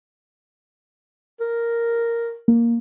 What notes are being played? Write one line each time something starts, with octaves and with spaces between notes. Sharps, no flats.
A#4
A#3